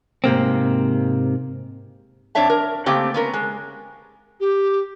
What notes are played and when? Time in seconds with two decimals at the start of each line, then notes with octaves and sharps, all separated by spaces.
0.24 G#2 C3 A#3 C4
2.35 F2 C4 D4 C#5 E5 A5
2.50 A#4
2.86 C#3 A3 A#3 C4 G4
3.14 B3 C#4 A#4
3.33 G#3
4.40 G4